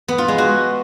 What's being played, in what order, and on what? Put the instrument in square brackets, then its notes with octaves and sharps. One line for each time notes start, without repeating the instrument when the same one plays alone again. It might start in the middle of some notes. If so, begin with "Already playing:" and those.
[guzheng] B3
F4
G#3
F#4